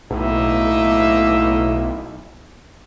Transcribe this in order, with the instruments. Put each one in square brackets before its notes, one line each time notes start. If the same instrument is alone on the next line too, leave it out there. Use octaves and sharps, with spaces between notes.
[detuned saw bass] B1 [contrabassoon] A2 [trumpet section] A#3 D#4 E5